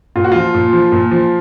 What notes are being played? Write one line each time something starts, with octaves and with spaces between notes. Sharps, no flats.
A#2 F4
F#4
F3 F4
A#2
F3
A#2
F3